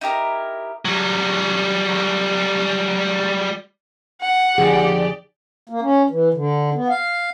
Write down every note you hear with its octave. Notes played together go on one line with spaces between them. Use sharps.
D#4 E4 G4 A#4
F#3 G3
F#5
F2 D3 F3 D#4 G4 G#4 D5
A#3
C#4
E3
D3
B3
F5